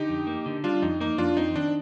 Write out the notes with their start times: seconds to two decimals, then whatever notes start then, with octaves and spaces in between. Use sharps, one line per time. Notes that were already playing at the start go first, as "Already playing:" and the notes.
Already playing: D3 D#4 G4
0.09 F2
0.27 A#3
0.46 D3
0.64 G3 D4 F4
0.82 F2 D#4
1.00 A#3 D#4
1.18 F2 D4 F4
1.37 C4 D#4
1.56 D#3 D4